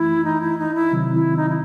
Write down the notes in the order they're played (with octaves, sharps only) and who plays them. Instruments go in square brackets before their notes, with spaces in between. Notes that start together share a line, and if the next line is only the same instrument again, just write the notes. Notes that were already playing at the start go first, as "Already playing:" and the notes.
Already playing: [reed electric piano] F#2 E3 A3 [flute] E4
[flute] D#4
E4
D#4
E4
[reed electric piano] C3 D#3 F#3 C4
[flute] E4
D#4
E4